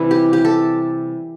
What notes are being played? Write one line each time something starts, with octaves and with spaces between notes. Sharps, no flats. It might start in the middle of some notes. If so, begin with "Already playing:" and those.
Already playing: C3 E3 G3 E4
G4
G4
A4